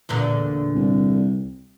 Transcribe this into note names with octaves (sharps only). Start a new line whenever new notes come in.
E2 A#2 D3
C2